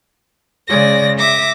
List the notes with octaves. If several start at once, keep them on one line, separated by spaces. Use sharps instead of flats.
C#3 G#3 D5 A#6
E5 D6 A#6